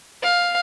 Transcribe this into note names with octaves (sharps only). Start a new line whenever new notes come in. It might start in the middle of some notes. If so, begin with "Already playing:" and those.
F5